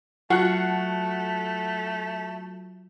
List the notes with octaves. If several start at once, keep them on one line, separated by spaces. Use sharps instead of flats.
F#3 A3 F4 F#4 F#5 A5 F#6